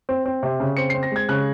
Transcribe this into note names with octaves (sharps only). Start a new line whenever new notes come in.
C4
C4
C3
C#3
C4 C#7
C4 C7
A#6
G#3 G#6
C#3 F#6